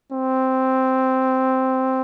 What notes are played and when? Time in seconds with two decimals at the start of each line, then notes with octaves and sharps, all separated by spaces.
0.12 C4